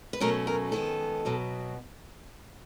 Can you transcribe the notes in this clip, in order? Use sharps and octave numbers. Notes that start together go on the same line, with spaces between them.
B4
B2 F#3 A3 C#4 A#4
A#4
F#2 D#3 G#3 B3 A4
B2 F#3 B3